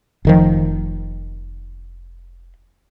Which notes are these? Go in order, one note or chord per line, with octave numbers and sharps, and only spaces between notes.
F1 D#3 F3